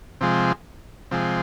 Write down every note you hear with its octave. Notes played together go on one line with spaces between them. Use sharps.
C3 F3 G#3
C3 F3 G#3